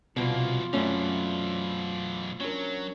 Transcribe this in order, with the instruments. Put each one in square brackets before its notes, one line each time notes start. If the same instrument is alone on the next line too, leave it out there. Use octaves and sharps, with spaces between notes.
[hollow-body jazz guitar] C2 B2 [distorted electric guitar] F2 A#3 [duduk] F4
[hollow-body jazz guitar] F#2 C#4 [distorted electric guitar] B2 E3 [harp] A3 C4 D5
[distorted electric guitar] F#3 [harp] C#4 D4 A#4